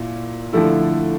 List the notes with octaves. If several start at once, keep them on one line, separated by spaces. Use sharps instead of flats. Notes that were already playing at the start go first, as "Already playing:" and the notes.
Already playing: A#2 E4
D3 F3 A3 E4